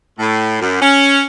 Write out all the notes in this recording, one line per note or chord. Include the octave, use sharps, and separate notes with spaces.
A2
F#2
C#4